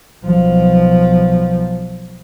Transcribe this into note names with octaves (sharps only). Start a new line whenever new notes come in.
B1 F3